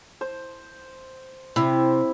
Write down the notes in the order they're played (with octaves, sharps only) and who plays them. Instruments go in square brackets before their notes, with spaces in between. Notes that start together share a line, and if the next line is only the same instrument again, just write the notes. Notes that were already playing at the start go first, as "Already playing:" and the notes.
[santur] C5
[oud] C3 [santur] E4